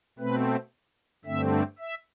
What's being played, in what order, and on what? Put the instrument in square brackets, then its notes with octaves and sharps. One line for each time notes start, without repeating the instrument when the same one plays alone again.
[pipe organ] B2 A3 C4 B4
G2 D3 A3 C4 E5
E5